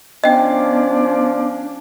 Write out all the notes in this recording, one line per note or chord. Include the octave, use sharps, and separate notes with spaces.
F3 B3 C#4 D4 D#5 G5